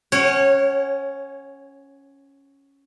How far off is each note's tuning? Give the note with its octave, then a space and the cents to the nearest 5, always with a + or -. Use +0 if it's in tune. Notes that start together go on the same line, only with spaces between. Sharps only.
C#4 +0 C#5 -20 F#5 +40